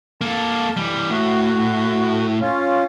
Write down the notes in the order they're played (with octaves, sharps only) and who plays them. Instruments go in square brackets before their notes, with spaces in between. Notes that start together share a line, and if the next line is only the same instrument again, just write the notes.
[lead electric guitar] A#3 A4 [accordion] A5
[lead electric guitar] E3 G3
[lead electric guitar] A2 [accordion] F#4
[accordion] C#4 F4